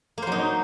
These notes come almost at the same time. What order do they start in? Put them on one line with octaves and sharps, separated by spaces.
A#3 C5 F#3 D#4